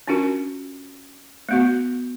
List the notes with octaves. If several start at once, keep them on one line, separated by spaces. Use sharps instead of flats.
C#4 D4 F4 F#4 A#4
A3 B3 F#4